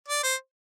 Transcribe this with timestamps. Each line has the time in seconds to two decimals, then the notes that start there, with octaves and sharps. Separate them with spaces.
0.08 D5
0.23 C5